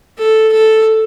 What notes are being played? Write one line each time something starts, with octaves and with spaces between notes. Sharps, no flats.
A4
A4